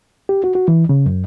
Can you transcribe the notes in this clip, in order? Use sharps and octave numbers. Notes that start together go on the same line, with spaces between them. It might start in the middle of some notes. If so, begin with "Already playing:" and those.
G4
F#4
F#4
E3
C#3
F#2